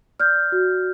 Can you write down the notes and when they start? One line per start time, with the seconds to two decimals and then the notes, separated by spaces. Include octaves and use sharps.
0.20 D5 F6 G6
0.52 F#4